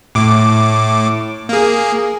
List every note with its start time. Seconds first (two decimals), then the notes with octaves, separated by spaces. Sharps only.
0.15 A2 D6
1.49 A#3 G#4